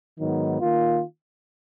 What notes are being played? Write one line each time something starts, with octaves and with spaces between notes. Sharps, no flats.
G#2 D#3 F#3 B3 D#4
D#3 A#3 F4